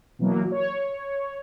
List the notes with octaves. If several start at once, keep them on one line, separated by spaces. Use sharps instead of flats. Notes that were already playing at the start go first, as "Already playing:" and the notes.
B2 E3 F#3 A#3
C#5